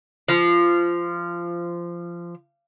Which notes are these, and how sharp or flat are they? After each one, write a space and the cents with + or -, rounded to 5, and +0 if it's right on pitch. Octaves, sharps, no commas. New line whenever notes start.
F3 -20